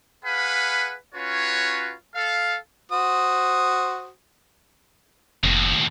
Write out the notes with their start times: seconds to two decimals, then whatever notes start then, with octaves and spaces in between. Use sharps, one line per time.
0.25 G#4 B4 F5 F#5 B5
1.15 C#4 F4 F#4 B4 C#5
2.15 A4 F5
2.92 F#4 C5 D#6
5.44 F1 D#2 A2